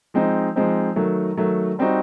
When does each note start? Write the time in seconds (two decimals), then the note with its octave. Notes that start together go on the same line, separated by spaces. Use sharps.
0.14 F3 G#3 C4 D#4
0.56 F3 G#3 C4 D#4
0.96 D#3 F#3 A3
1.37 D#3 F#3 A3
1.79 G3 C4 D#4 F#4